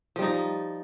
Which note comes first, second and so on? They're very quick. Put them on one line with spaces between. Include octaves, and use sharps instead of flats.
F3 G3 D#4